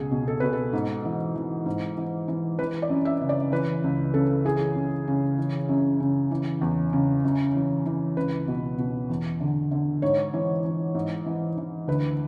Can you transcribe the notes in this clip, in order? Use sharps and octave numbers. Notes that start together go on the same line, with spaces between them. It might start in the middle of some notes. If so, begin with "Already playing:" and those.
Already playing: C#2 B2 G#4
B2
A4
B2 B4
A4
G#2
E3
E3
G#2
E3
E3
E3 B4
D5
F#2
E5
C#3
D5
E3 B4
C#2
C#3 A4
E3 G#4
F#2
C#3
E3
F#2
C#3
E3
E2
C#3
F#2
E3
E3
C#2 B4
B2
B2
E2
D3
D3
G#2 C#5
E3
E3
G#2
E3
E3
D2 B4